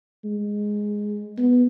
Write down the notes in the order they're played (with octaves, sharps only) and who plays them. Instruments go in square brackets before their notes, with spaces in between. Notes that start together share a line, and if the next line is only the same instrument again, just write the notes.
[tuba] G#3
B3